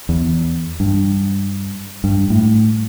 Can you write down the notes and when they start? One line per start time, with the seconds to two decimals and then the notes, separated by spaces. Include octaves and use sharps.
0.09 E2
0.80 G2
2.04 G2
2.30 A2